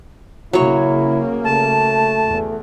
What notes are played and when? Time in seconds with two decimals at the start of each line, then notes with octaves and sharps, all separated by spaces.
0.53 C#3 F#3 A#3 E4 C#5
1.44 A3 A5
2.27 E2